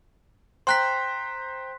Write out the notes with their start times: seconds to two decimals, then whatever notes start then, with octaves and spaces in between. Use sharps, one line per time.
0.67 C5 G5 A#5 C6 F#6 B6